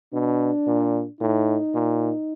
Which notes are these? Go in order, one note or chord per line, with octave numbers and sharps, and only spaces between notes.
B2 D4
A#2
A2 D#4
A#2